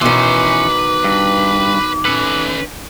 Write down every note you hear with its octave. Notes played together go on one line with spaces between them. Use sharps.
B2 D#3 E3 C#4 B4 C6 D6
G2
C#4 A4 B4